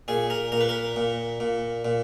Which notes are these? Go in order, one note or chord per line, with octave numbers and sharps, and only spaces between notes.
A#2 G#4
A#4
A#2 A#4
B4
A#4
A#2
A#2
A#2